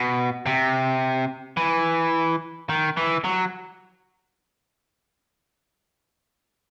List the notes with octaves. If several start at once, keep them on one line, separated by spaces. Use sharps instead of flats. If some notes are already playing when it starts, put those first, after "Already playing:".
Already playing: B2
C3
E3
D#3
E3
F#3